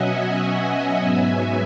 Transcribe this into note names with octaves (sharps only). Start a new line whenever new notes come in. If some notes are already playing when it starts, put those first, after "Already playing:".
Already playing: B2 F#3 C#4 D#5 E5 F#5 G#5
D#5 F#5
G#2 F#3 B3 E5 G#5